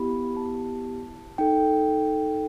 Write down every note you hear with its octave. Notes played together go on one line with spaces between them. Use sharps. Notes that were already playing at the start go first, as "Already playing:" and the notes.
Already playing: B3 E4 G4 B5
A5
D#4 A4 G5